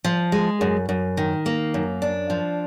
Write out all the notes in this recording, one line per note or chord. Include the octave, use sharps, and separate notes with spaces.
F3
G#3
F#2
F#2
D#3
A#3
F#2
D4
F3